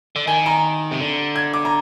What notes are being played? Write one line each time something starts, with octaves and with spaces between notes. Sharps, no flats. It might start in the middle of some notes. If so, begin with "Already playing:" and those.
D3
D#3 G#5
A#5
C3
D3
G#6
D6
A#5